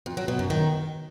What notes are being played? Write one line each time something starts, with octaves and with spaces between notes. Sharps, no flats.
F2
F#3
B2
F#2
D#3